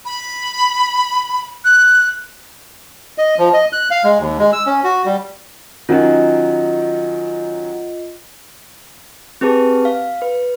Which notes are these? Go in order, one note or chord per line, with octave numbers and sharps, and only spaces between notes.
B5
F#6
D#5
F3
D#5
F#6
F5
G#3
D#2
G#3
E6
C#4
F#4
G3
D#3 F#3 C#4 F4 D#5
C4 G4 G#4 B4 A5
F5
B4